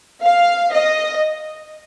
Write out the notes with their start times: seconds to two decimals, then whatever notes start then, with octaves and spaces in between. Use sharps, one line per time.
0.22 F5
0.72 D#5